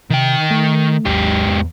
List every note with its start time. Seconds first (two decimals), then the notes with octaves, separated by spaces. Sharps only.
0.10 C3 D#3 G5
0.51 A3
1.05 G#1 D#2 G#2 F#3 G4
1.46 E2